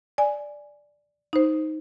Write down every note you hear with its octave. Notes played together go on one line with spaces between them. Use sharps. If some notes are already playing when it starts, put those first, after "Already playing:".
D5 G#5
D#4 C5